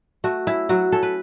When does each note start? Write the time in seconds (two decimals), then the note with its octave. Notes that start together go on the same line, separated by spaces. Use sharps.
0.24 A3 F#4
0.47 C#4 E4
0.69 F#3 F#4
0.92 C#4 A4
1.03 B4